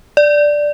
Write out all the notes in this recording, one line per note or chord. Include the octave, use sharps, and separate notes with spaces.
D5